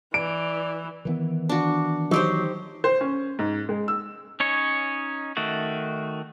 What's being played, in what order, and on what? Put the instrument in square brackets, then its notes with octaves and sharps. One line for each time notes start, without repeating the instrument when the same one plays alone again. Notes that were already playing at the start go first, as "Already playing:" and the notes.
[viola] E3 [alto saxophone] D5 [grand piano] D7
[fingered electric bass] D#3 E3 B3
[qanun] D4 F#4
[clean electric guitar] F#3 [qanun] D#4 G4 C5
[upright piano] C5
C#4
G#2
G#3
E6
[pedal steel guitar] C#4 D#4 C#5
D#3 A3 F#4